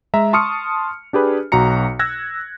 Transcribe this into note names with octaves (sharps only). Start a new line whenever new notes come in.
G#3 E5 A#5
A5 C6 C#6 D#6 F6 C#7
D4 G4 G#4 B4
B1 F#4 A#5 C#7
E6 F#6 G#6 A#6